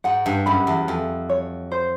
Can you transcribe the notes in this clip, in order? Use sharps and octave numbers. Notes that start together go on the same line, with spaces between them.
G#2 F#5
G2
F#2 B5
E2
F2 G#4
C#5
C5